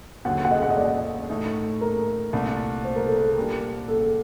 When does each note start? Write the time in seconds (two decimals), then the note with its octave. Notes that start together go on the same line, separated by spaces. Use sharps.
0.25 D#2 D3 F#3 F#5
0.45 F#5
0.51 D#5
0.62 F#5
0.70 D#5
0.77 D5
1.29 A2 A3 D#4
1.81 A#4
2.33 C2 A#2 A3 D4
2.85 C5
2.96 A#4
3.06 A4
3.18 A#4
3.36 A#2 G3 D4
3.88 A4